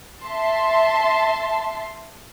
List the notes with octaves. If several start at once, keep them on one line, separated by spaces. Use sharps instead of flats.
E5 A5 C6